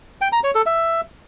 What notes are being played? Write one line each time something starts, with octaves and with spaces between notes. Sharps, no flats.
G5
A#5
C#5
A4
E5